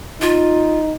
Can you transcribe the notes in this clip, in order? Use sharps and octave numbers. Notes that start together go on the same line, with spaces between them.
D#4 F4